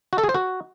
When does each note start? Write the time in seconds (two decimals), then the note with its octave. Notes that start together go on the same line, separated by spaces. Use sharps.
0.13 F#4
0.18 A4
0.24 G#4
0.29 C5
0.34 F#4